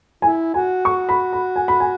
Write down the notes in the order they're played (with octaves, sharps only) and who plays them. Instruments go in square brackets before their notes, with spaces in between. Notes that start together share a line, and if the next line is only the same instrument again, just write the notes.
[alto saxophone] E4 [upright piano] G#5
[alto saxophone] F#4 [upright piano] G#5
[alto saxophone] F#4 [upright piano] C#6
[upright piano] B5
B5
G#5
B5
G#5